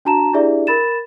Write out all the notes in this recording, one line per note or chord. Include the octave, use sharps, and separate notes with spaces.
D4 F#4 A5 A#5 E7
D4 E4 G4 G#4 D5 E5
A#4 B5 A6 E7